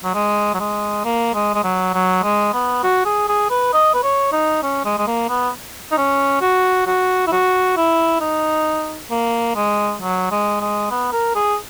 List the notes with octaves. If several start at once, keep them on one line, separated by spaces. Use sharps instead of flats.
F#3
G#3
F#3
G#3
A#3
G#3
G#3
F#3
F#3
G#3
B3
F#4
G#4
G#4
B4
D#5
B4
C#5
D#4
C#4
G#3
G#3
A#3
B3
D#4
C#4
F#4
F#4
E4
F#4
E4
D#4
A#3
G#3
F#3
G#3
G#3
B3
A#4
G#4